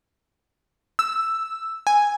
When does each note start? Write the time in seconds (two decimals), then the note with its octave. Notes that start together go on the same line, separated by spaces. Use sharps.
0.99 E6
1.87 G#5